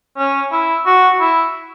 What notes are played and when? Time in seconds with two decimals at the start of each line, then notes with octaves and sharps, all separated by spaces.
0.18 C#4
0.52 E4
0.86 F#4
1.20 E4